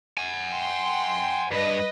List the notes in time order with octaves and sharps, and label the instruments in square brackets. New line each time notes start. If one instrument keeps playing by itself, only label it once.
[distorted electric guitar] F#5 G#5
[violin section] G5 C6
[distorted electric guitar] G2 [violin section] B4 D#5